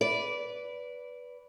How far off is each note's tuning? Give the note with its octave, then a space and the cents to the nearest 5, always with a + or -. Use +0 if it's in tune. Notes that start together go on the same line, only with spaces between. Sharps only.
B4 -5 D5 -20